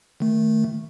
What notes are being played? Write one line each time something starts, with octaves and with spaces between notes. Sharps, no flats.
D#3 A3